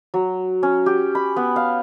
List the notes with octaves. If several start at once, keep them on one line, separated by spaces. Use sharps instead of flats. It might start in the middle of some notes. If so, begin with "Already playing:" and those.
F#3
C#4
G4
B5
B3
F5